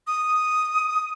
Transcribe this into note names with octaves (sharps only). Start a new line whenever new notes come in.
D#6